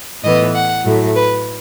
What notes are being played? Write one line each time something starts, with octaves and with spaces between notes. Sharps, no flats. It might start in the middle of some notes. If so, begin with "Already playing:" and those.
A2 E3 B3 D#5
F#5
A2 F#3 A3
B4